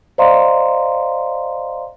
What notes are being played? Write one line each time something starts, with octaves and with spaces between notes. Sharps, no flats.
C5 D5 D#5 F5 A#5 C6